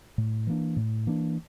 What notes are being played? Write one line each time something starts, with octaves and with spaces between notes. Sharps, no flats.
A2
E3 A#3 D4
A2
E3 A#3 D4